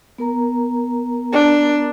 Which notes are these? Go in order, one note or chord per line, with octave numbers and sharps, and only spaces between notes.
B3 A#4 A#5
D4